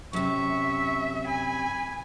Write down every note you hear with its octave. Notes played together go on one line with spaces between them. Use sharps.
F#2 C3 E5 C#6
G#5 B5